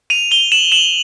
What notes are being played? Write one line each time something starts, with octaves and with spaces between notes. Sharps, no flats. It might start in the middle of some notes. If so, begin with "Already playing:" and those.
D#7 F7
F7 G7
E7 F#7
E7 F#7